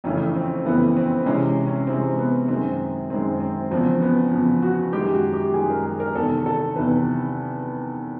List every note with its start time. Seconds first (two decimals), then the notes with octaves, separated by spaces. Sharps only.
0.04 F2 C#3 E3 A3 C#4
0.36 C4
0.65 F2 C#3 E3 A3 B3
0.97 C4
1.26 C3 E3 G#3 C#4
1.48 C#4
1.67 C#4
1.87 C3 E3 G#3 C4
2.18 B3
2.48 F#2 D#3 G#3 C4
3.10 F#2 D#3 G#3 C4
3.40 C4
3.71 E2 C#3 F3 C4
4.01 B3
4.31 E2 C#3 F3
4.62 F#4
4.93 F#2 D#3 G#3 G4
5.14 F#4
5.33 G4
5.54 F#2 D#3 G#3 G#4
5.70 A#4
5.85 G#4
6.00 A#4
6.15 E2 C3 D#3 A4
6.46 A4
6.76 E2 C3 D#3 B4